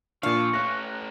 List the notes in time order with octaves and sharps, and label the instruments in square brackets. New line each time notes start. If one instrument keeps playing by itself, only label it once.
[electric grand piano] A#2 D4 [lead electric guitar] F3 [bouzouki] F5 [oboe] C#6
[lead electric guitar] A3 C#4 [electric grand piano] F#6 A#6